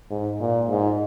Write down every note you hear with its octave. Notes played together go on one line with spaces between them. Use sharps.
G#2
A#2
G#2